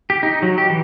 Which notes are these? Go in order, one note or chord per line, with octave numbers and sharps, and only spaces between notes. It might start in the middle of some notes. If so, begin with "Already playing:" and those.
G4
D#4
F#3
G4
E3